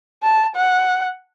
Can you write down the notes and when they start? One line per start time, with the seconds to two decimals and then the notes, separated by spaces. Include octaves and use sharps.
0.23 A5
0.56 F#5